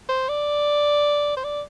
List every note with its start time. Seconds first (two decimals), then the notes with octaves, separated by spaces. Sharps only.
0.09 C5
0.29 D5
1.37 C5
1.44 D5